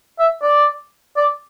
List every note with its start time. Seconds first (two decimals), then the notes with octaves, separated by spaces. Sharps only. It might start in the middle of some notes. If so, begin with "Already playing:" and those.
0.19 E5
0.43 D5
1.17 D5